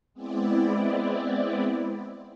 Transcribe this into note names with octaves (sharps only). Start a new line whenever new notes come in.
G#3 B3 C4 E4 D5